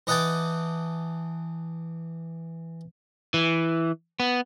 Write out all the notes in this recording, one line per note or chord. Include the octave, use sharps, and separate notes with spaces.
E3 D#5 F#5 G5 A5 D6
E3
B3